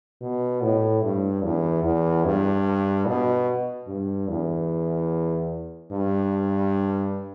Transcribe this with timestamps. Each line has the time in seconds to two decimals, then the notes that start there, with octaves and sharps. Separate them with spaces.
0.21 B2
0.62 A2
1.03 G2
1.43 E2
1.84 E2
2.25 G2
3.07 B2
3.88 G2
4.29 E2
5.92 G2